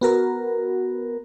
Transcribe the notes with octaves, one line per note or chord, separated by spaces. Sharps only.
B3 F#4 A#4